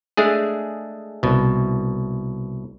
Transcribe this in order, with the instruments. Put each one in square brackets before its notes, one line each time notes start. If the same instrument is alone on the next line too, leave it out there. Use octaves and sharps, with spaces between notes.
[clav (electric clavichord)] G#3 A3 D4 G#4
C2 B2